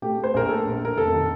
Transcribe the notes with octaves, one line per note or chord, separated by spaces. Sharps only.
A3 G4
A3
C5
A#1 A#4
A3 A4
A#1
A#1 A#4
F1 A4
D#3